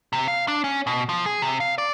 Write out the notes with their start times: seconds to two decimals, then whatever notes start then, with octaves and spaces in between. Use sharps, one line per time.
0.13 C3
0.28 F5
0.48 D4
0.64 C#4
0.87 B2
1.09 F3
1.26 G#4
1.42 C3
1.60 F5
1.78 D5